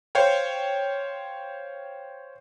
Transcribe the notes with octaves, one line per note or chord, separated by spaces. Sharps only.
C5 C#5 F5 G5